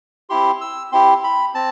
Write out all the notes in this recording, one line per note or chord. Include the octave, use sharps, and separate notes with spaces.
C4 E4 G4 C6
E6
C4 E4 G4 C6
B5
C4 A5